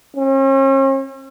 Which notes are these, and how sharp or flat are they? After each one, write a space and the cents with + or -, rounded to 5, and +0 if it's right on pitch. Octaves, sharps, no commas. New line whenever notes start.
C#4 -45